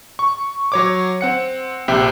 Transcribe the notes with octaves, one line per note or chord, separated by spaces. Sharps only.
C#6
F#3 C#5 D6
C4 F#5 C#7
A#1 C3 E5 G5